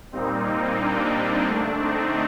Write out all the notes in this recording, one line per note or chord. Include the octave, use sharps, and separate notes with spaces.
A#2 G3 A#3 C4 D#4
D4
C4 D#4
D3 A3 D4
C4 D#4